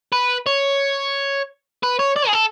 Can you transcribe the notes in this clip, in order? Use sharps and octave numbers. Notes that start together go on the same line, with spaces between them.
B4
C#5
B4
C#5
D5
G#4
A4